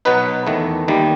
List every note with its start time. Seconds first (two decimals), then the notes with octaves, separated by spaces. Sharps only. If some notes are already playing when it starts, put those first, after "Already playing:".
0.05 B2 F#3 B3 D#4 B4
0.47 E2 D#3 A3
0.88 D#2 D#3 G3